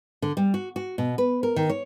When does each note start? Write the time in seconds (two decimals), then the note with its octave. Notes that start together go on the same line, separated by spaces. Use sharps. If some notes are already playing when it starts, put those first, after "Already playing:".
0.22 D3
0.37 G3
0.54 F#4
0.76 F#4
0.98 B2
1.18 B4
1.43 A#4
1.56 D#3
1.69 C#5